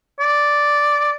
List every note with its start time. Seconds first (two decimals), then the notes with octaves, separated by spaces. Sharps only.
0.20 D5